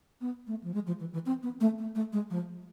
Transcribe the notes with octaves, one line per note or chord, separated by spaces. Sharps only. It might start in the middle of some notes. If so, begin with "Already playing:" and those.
B3
A3
F3
G#3
F3
E3
E3
C4
B3
A3
A3
A3
G#3
F3